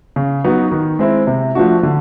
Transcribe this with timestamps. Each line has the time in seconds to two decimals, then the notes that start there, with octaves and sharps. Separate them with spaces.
0.16 C#3
0.44 F#3 B3 D#4 F#4
0.72 D#3
0.99 G#3 C4 E4
1.27 C3
1.55 F3 A3 D4 F#4
1.83 D3